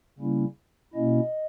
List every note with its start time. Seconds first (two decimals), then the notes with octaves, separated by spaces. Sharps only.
0.19 C#3 G3 A#3 C#4 E4
0.94 B2 A#3 C#4 E4 D#5